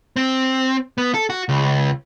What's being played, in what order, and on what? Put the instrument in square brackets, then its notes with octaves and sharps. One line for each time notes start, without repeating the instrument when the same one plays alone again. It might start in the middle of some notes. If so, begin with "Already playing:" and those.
[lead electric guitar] C4
B3
A4
F#4
C#2